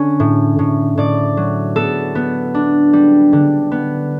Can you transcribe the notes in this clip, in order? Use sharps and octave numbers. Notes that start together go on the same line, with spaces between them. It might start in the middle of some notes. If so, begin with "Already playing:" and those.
Already playing: D3 C#4
A2
A2
A2 D5
F#3
B3 A4
B3
D4
G3
D3
B3